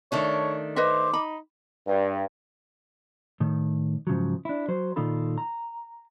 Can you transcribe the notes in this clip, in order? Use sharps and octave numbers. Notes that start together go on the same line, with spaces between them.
D#3 A3 D4 C#5
B4 C5 D#5 E5 D6
D#4 B5
G2
A2 D#3
G#2 C#3 F3 F#3
D4 E4
F#3 C5
A#2 D#3 D#4 F4 A4 B5
A#5